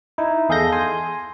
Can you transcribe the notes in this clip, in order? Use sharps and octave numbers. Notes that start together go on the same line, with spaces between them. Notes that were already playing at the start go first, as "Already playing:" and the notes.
D#4 E4
E2 G#4 A4 F5 G6 A#6
G#5 C6